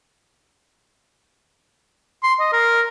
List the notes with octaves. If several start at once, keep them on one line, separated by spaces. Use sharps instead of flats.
C6
D#5
A#4